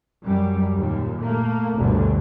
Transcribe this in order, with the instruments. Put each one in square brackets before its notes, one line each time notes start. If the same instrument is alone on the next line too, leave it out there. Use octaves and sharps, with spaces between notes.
[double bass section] F#2 G3
D#2 A#2
A3 A#3
G1 D2 B2 D3